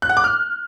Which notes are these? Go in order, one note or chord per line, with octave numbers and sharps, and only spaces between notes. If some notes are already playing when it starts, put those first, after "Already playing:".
F#6
F#5
D6
F6